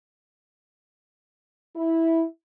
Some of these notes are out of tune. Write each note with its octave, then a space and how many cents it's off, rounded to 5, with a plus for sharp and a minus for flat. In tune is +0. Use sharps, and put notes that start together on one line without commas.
E4 -10